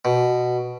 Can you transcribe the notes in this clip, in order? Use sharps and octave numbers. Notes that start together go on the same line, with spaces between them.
B2